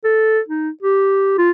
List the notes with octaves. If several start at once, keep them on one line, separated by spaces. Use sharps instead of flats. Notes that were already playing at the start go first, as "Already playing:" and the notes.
A4
D#4
G4
F4